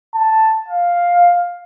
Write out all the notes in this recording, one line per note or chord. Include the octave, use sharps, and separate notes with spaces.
A5
F5